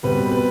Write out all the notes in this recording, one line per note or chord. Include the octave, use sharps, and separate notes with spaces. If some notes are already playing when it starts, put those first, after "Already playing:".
B2 G3 C4 B4
B4